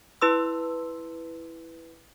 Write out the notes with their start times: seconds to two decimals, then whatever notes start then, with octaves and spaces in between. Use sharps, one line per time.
0.22 E4 B4 C6 E6